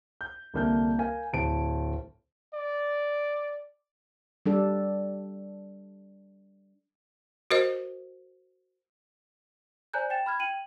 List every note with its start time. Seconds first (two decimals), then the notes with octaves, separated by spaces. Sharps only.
0.21 G6
0.54 C2 D3 A#3 A5 G6
0.99 A#4 F5 G#5
1.33 D1 A5 D7
2.54 D5
4.46 G3 D4 A4
7.51 F#4 A#4 C5 D#5
9.93 C5 D5 G#5 A#5 F#6 G6
10.10 G5 A6 E7
10.26 B5 F6 G#6
10.39 G5 D#7 F#7